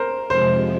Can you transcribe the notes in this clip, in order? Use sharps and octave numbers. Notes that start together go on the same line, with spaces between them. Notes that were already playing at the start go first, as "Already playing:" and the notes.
Already playing: A#4 C5
F2 C3 F3 G#3 C5